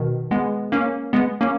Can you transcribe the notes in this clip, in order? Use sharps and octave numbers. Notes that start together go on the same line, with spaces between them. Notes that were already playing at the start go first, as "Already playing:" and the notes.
Already playing: B2 D#3
G#3 B3
A#3 C#4
G#3 B3
A#3 C#4